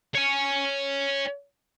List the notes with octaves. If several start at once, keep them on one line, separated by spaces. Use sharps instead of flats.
C#5 G#5